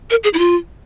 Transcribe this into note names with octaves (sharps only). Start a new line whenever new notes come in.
A#4
G#4
E4
F4